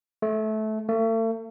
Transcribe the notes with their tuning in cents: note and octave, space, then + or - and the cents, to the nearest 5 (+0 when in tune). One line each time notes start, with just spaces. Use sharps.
A3 -20
A3 +40